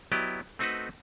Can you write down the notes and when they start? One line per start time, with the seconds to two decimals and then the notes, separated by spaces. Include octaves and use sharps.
0.12 F#3 B3 E4 G4 D5 D#5
0.59 A3 C4 D#4 F#4 A4 B4